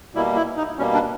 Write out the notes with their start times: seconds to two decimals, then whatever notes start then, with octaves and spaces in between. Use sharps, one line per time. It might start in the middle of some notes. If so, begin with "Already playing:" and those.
0.15 B2 G3 A#3 E4
0.36 E4
0.57 D#4
0.78 B2 G3 A#3 C#4
0.94 D4